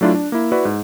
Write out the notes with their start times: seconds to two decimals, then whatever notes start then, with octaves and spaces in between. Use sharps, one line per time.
0.01 F#3 A3 D4 E4 F4
0.14 D4
0.32 A#3 E4
0.52 E4 F#4 B4 D5
0.65 G#2